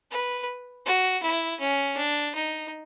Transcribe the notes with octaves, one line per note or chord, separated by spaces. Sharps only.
B4
F#4
E4
C#4
D4
D#4